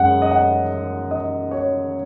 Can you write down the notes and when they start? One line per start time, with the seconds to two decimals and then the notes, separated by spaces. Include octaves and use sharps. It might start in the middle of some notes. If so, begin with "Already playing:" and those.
Already playing: F#2 G#3 F#5
0.22 D#5
0.31 F#5
1.11 D#5
1.51 C#5